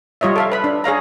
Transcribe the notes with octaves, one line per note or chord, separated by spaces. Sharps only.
G3 F4 C#5 D#5 E5
A4 E5 F5
B4 B5
D4
G#4 C#5 F5 A#5